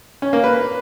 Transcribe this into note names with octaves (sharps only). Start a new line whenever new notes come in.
C#4
A#3
B4